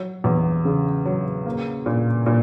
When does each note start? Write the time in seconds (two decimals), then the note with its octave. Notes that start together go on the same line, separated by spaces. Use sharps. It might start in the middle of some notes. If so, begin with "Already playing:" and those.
Already playing: F#3
0.24 E2
0.65 C#3
1.05 F#3
1.46 A#3
1.86 A#2
2.26 A#2